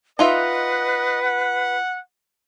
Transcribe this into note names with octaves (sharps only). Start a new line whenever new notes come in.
D#4 F4 B4 D#5 E5 F#5
F#5